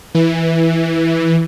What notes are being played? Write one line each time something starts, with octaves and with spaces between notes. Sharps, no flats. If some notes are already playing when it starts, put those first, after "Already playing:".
E3